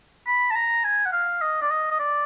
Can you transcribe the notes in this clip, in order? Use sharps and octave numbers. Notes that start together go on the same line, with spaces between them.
B5
A5
A#5
G#5
F#5
F5
D#5
D5
D#5
D#5
D5